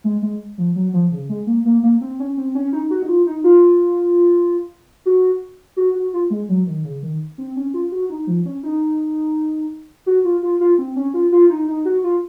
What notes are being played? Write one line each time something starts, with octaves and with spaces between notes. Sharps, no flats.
G#3
G#3
F3
F#3
F3
C#3
G#3
A#3
A#3
A#3
C4
C#4
C4
C#4
D#4
F#4
D#4
F4
D#4
F4
F#4
F#4
F#4
F4
G#3
F#3
D#3
C#3
D#3
C4
C#4
F4
F#4
D#4
F3
C#4
D#4
F#4
F4
F4
F4
C4
C#4
F4
F4
D#4
D#4
F#4
F4